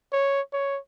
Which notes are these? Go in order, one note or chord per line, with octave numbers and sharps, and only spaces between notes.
C#5
C#5